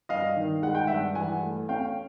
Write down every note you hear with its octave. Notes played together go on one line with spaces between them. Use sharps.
G2 D#5 F5
D#3
G#3 F#5
G5
G2 E5 F#5
E3 F#5 G#5
A3
C#4 F5 G5